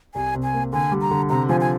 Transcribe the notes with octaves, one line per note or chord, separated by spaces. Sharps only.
C2 G#5
C3
G#5
A#3
D3 G#5
G3
A#5
D3
C3 A#5
F3 G#5
G#5